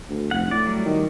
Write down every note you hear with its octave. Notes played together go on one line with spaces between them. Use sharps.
D2
F1 F#5
A2 D5
F#3 G3
D#3